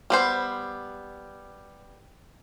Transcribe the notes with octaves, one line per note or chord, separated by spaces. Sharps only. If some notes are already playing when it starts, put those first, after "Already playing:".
G3 B3 C5